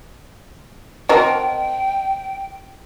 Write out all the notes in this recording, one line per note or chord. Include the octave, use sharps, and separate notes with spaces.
C4 F#4 A#4 D#5 G5 A5